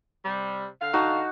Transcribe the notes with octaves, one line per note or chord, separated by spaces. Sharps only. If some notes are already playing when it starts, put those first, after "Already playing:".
C3 G3
D3 F5
D#4 F#4 A5